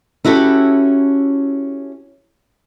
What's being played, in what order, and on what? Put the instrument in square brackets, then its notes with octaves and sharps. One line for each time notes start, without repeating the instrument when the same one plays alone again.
[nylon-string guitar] C#4 E4 F#4 G4 A4